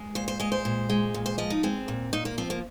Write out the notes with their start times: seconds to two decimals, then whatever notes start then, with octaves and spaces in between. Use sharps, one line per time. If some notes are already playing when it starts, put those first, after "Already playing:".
Already playing: G#3
0.15 A#2 C5
0.28 C5
0.40 G#3 D#5
0.52 C5
0.65 A#2
0.90 G#3
1.14 A#2
1.26 C5
1.38 F3 D#5
1.50 D#4
1.63 G#3 C4
1.88 A#2
2.13 A#2 D#4
2.25 A#3
2.38 F3 C4
2.50 A#3